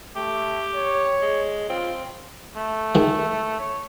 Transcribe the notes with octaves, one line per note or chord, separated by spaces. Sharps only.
A3 G4
C#5
G#3
C4 F4
A3
D#3 G#3
C#5